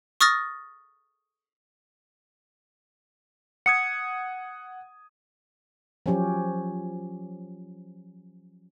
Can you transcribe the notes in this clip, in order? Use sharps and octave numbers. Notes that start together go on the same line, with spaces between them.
C#6 D#6 F6 A6 A#6
F#5 D#6 G#6 C#7
F3 F#3 C#4 G4